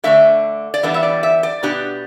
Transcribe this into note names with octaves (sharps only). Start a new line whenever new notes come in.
D3 A3 D4 E5
D5
E3 G3 B3 D4 E5
E5
D5
E5
D5
B2 B3 D4 G4